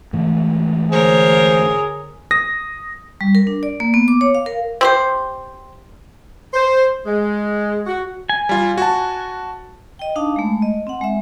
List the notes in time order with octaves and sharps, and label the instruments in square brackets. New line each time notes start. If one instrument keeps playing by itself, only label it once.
[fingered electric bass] G#2 E3 A3
[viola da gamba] D3 A#4 C#5 [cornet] G#4 [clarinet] C5
[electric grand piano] D#6 A#6
[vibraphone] G3
A#4
D4
D5
A#3
B3
D6
C#5
F5
A#4
[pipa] C4 G4 C5
[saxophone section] C5
G#3
F#4
[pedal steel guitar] G#5
[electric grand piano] G3 F4
F#4 A5
[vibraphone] D#5 G5
D4 D#4 F5 A5
G#3 A3
D#5
C4 F#5
G#3 E5